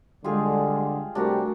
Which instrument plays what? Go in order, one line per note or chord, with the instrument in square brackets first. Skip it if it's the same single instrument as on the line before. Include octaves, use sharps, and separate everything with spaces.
[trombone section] D3 [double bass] G3 G#3 [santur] F4 G4 G#4
[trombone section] C3 G3 G4 [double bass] A3 [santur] D4 F#4 A#4